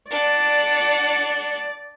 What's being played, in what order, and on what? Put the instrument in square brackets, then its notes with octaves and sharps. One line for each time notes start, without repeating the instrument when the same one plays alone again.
[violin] D4 F#5 [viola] D5